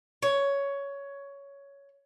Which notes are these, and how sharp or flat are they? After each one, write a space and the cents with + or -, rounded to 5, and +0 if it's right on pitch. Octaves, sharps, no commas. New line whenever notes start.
C#5 +10